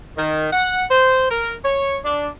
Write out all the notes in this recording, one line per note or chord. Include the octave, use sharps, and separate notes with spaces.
D#3
F#5
C5
A#4
C#5
D4